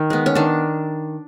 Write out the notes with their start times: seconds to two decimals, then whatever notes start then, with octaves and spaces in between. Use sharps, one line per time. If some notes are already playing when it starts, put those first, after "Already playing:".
Already playing: D#3
0.10 G#3 B3
0.26 C#4
0.35 D#3 D4